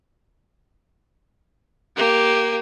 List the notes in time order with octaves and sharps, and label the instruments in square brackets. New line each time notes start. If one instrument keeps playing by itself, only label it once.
[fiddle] A#3 [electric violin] G4